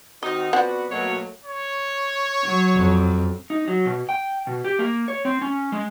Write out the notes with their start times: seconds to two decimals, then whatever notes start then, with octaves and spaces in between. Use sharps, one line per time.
0.23 D#3 C4 D#4 F#4 D#5
0.53 F3 B3 C4 F#4 B4 D5 F#5
0.90 B2 F#3 A3 A#3 C#5
1.45 C#5
2.44 F#3
2.77 F2
3.50 D#4
3.68 F#3
3.86 B2
4.09 G5
4.47 B2
4.64 G4
4.79 A#3
5.08 C#5
5.25 C4
5.41 C#4
5.72 G#3